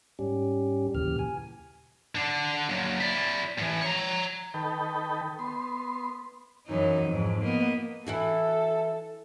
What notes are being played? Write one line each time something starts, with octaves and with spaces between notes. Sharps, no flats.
G#2 G3 C#4 G4
D#2 A#2 C#3 E3 G4 F6
G#5
D3 D4
F#3 A#3
E4 D5
A2 E3
C#5 A#5
D#3 A4 B4 G5
B3 C6
F#2 E3 D#4
F2 G#2
A#3 B3 D#5
E3 E4 F#4 A4